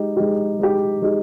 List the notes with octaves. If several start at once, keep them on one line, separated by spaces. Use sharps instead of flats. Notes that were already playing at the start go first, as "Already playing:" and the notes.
Already playing: G#3 D#4 G4
G#3 D#4 G4
G#3 D#4 G4
G#3 D#4 G4